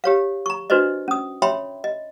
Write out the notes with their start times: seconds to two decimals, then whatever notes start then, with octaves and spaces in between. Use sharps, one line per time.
0.04 G4 C#5 F5
0.46 A#5 C#6
0.70 D4 F#4 B4 C5 D5 D#5
1.08 C#4 D#6
1.42 C#5 E5 G5 B5 C6
1.84 D#5